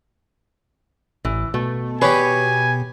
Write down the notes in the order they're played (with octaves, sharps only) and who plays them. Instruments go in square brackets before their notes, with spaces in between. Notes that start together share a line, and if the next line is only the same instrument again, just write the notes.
[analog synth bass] A1 [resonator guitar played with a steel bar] E3
[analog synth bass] B2 [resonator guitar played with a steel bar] A3
[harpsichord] G4 G#4 [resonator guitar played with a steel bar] B4 C#5 [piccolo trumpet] G#5